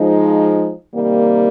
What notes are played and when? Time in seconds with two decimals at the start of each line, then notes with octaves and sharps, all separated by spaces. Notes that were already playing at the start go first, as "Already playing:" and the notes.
Already playing: F3 G#3 D#4
0.95 C3 D#3 G3 A#3